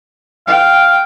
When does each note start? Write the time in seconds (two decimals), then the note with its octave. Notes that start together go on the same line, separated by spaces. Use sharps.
0.47 F5 G5